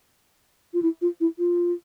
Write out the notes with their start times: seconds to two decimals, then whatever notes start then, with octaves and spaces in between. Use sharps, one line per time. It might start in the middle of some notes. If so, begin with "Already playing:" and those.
0.74 F4
0.82 E4
1.02 F4
1.20 E4
1.39 F4